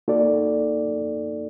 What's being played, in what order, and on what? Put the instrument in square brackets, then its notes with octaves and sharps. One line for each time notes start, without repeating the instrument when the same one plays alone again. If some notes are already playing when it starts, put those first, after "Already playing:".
[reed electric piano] A#3 D#4 F#4 A4 D5